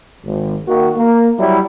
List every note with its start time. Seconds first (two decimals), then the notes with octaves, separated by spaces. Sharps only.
0.23 G#1
0.67 D#3 A#3 F#4
0.96 A#3
1.38 F#3 G3 E4